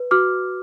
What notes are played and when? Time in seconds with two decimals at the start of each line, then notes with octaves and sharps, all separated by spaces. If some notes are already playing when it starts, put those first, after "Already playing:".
Already playing: B4
0.11 F#4 D6 F6